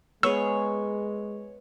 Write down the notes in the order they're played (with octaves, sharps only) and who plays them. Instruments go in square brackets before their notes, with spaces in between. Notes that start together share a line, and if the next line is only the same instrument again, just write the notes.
[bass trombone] G#3 [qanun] B3 G#4 [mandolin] C#5 [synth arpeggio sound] E6